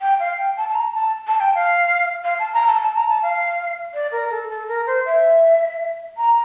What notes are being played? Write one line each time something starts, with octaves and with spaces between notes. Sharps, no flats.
G5
F5
G5
A5
A5
A#5
A5
A5
G5
F5
F5
A5
A#5
A5
A5
A#5
A5
F5
D5
A#4
A4
A4
A#4
C5
E5
A#5